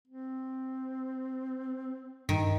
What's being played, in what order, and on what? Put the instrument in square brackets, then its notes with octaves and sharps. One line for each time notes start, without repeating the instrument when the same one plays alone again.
[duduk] C4
[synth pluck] G2 [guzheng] D#3